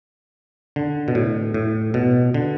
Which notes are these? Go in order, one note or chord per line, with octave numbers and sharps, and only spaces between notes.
D3
B2
A2
A2
B2
D3